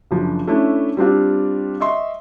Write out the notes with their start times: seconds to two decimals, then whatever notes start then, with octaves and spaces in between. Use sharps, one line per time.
0.11 F#1 F3 D4
0.47 A3 C#4 D4 E4
0.97 G3 C4 D4 F4
1.80 D#5 E5 C6 C#6